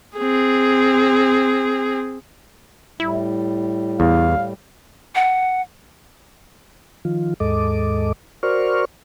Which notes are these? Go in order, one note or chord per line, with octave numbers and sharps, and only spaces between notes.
C4 G#4
A2 G3 E4
E2 F5
F#5
D#3 F3 F4
D#2 G#2 G#3 A4 D#5 D6
F#4 A#4 C5 D5 C#6 F6